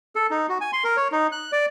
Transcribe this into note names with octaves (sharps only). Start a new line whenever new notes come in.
A4
D#4
F#4
G#5
C6
A#4
C#5
D#4
F#6
D5